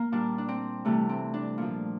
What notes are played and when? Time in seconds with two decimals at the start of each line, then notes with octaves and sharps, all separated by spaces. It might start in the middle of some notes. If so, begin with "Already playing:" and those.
Already playing: A#3
0.12 A#2 G3 D4
0.38 D4
0.48 C4
0.85 C3 E3 G3 A3
1.09 C4
1.34 D4
1.58 A#2 F3